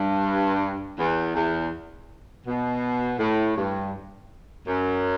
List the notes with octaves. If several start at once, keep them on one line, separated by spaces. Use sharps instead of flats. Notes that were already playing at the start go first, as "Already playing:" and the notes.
Already playing: G2
E2
E2
B2
A2
G2
F#2